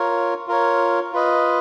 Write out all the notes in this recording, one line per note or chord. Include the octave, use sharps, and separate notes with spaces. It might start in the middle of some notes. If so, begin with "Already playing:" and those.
Already playing: F4 A#4 C#5
F4 A#4 C#5
F4 B4 D#5